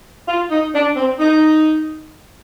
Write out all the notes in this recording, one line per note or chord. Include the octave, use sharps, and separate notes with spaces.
F4
D#4
D4
C4
D#4